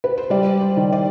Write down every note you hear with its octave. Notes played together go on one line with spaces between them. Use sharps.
B4
C5
G3 D5
C5
D#3
D5